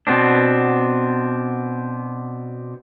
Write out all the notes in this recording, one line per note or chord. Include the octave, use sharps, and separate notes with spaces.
B2 B3 C4 D4